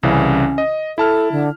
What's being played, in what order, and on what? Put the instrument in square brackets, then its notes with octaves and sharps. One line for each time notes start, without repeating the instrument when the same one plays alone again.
[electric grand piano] C2 C#3 E3 [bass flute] C#4
[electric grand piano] D#5
[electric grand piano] E4 A5 F6 [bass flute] A4
[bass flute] D3